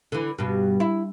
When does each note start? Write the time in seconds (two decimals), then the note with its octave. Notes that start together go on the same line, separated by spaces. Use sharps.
0.12 D3 E3
0.39 G2 B2
0.80 E4